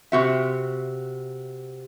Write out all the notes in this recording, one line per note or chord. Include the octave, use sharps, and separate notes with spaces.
C3 F#4 E5